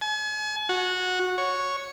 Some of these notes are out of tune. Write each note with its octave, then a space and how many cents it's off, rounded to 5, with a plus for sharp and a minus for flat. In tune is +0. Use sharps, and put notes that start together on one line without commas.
G#5 +40
F#4 -15
C#5 +0